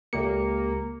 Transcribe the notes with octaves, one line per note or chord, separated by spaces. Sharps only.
C#2 A#3 G4 C#7